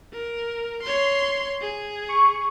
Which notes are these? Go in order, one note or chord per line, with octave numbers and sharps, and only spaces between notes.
A#4
C#5 C6
G#4
C#6